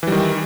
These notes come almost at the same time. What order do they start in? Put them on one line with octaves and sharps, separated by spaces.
E3 G3 D#3